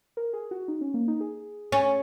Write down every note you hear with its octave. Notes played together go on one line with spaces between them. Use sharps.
A#4
G#4
F#4
D#4
C#4
A#3
D#4
G#4
C#4